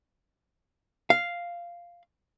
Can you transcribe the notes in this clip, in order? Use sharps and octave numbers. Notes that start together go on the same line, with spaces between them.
F5